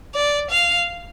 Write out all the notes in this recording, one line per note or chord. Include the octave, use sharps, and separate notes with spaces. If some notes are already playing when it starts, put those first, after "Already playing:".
D5
F5